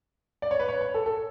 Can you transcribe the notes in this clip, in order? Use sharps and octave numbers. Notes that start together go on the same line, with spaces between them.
D5
C#5
B4
C#5
C#5
A4
A4